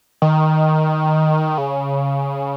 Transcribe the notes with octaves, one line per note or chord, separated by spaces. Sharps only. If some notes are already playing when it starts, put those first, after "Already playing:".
D#3
C#3